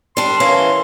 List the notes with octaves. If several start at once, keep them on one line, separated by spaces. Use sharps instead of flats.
G3 D4 C6
E3 A#3 C#4